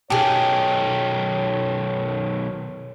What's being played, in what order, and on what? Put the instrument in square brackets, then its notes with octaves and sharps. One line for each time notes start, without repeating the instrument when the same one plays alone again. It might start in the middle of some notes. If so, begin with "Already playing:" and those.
[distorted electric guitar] B1 D#3 [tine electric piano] B2 A5 [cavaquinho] G4 G#4 [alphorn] C#5